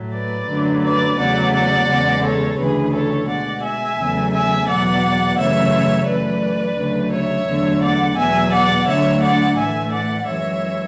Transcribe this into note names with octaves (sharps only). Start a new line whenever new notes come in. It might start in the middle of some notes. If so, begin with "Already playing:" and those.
Already playing: A2 F#3 A3
B4 D5
F#2 D3 F#3 A3
B4 D5
E2 C#3 F#3 A3 D5 F#5
D5 F#5
E2 C#3 G#3
A4 C#5
D2 C#3 E3 G#4 B4
A4 C#5
B2 G#3 D5 F#5
E5 G#5
E2 C#3 F#3 A3
E5 G#5
E2 B2 F#3 D5 F#5
F#2 C#3 E3 A3 C#5 E5
F#2 E3 A3 B4 D5
D2 C#3 F#3 A3
C#5 E5
E2 D3 F#3 A3
D5 F#5
E2 B2 F#3 E5 G#5
D5 F#5
D2 D3 F#3 A3 C#5 E5
D5 F#5
A2 E3 A3 E5 G#5
D5 F#5
F#2 E3 G#3 C#5 E5